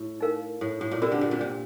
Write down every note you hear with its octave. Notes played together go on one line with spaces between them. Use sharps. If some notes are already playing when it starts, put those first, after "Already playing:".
Already playing: A2
D#4 A#4 F5
A2
A2
A#2
C3 F4 A#4 D5
D3
A#2
C3
A#2